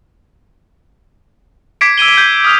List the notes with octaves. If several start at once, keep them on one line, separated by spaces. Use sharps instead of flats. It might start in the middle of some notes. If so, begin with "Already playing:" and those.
D6 G#6 B6 C7 D7
E6 G#6 D#7 G7
G6 G#6
D#6 F6 F7